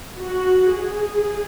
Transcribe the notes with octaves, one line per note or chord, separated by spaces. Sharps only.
F#4
G#4